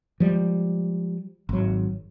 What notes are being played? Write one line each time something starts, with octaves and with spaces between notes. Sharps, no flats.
F3 G3 G#3
G#1 F#3